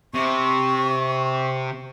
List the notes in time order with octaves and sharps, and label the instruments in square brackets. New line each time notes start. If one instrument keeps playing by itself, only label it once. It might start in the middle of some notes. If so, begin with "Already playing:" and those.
[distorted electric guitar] C3 [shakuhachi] C#6